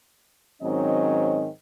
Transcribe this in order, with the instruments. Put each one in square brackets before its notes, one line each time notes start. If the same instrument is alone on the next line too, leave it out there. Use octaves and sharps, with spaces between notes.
[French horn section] G#2 D#3 F#3 C4 C#4 D#5